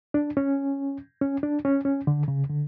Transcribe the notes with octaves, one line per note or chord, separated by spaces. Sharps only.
D4
C#4
C#4
D4
C#4
C#4
D3
C#3
D3